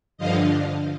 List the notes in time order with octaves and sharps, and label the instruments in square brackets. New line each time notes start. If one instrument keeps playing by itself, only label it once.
[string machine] G2 D3 F3 D#5 F5